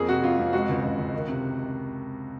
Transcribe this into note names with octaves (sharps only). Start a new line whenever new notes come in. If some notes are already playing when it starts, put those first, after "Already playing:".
Already playing: F2 A#3 G#4
C3 F#4
F2 F4
F2
G#3 F#4
C#2
C#2
C#2
D#3
C3